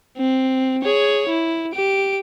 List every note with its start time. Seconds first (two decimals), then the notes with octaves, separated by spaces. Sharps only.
0.17 C4
0.83 G#4 C#5
1.29 E4
1.75 G4 D7